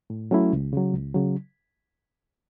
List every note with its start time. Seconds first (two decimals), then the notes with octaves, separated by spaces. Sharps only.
0.10 A2
0.31 F#3 A3 C#4 E4
0.53 C#2
0.73 C#3 F#3
0.94 C#2
1.14 C#3 F#3